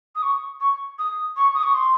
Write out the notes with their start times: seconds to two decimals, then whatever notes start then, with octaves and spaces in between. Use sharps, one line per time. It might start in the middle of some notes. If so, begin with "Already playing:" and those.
0.15 D#6
0.23 C#6
0.60 C#6
0.99 D#6
1.36 C#6
1.54 D#6
1.63 C#6
1.74 C6